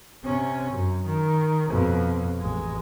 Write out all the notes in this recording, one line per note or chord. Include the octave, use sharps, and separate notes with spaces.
C3 C#4
F#2
D#3
F2 B2
A1 G#3